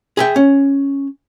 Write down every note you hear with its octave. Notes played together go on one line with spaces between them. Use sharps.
G#4 E5 G5
C#4